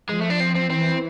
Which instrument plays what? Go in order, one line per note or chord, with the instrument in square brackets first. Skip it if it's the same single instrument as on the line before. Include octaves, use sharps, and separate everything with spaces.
[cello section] F3 [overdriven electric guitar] G#3
[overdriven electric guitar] A3
D4
C4
C4
[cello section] E3 [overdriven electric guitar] C4